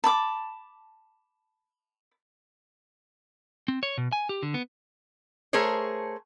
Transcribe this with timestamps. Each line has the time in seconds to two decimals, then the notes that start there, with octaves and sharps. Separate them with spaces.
0.04 A5 B5 D6
3.68 C4
3.83 C#5
3.98 B2
4.12 G#5
4.29 G4
4.43 D3
4.54 B3
5.53 A3 G#4 A#4 C5 C#5